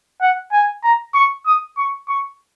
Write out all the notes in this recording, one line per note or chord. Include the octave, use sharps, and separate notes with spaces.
F#5
G#5
A#5
C#6
D#6
C#6
C#6